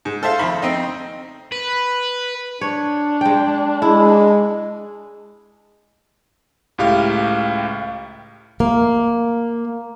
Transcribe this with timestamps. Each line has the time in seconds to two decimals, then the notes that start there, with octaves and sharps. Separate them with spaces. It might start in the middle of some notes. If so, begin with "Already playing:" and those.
0.05 G#2
0.23 A4 C5 E5 F5
0.38 F2 D#3 B5 C#6
0.62 C4 D#4
1.52 B4
2.61 D4 C#5
3.21 G#3 G5
3.82 G#3 E4
6.78 C#2 A2 G4 F5
8.60 A#3